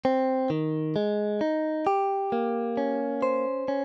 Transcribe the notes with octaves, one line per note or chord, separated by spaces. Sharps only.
C4
D#3
G#3
D#4
G4
A#3
C#4
C5
C#4